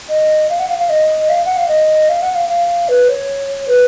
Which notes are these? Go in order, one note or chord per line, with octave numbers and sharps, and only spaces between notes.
D#5
F5
F#5
F5
F5
D#5
F5
F#5
F5
D#5
F5
F#5
F5
F5
B4
C#5
B4